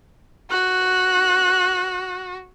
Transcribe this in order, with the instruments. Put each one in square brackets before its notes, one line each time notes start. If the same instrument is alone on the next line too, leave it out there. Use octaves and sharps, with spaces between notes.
[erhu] F#4 [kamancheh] F#6